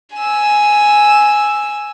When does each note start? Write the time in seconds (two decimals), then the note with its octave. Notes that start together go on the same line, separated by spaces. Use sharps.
0.16 G#5 E6